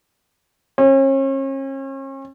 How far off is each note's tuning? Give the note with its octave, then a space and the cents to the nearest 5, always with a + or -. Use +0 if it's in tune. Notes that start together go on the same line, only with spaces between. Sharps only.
C#4 -40